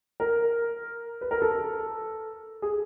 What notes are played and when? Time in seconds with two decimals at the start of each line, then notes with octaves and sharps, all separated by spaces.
0.20 A#4
1.21 B4
1.31 A#4
1.42 A4
2.62 G#4